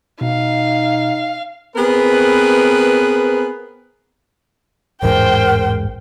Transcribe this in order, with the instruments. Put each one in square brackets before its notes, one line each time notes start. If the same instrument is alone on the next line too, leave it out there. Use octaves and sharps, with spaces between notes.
[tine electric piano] B2 [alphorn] D#4 [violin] F5
[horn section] B3 C4 G#4 A#4 B4
[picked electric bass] A1 E2 G#2 [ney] A#4 [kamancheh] C5 G5